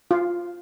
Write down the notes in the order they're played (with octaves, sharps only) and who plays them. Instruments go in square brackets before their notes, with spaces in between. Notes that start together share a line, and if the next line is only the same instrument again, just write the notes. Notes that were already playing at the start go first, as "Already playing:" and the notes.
[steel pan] F4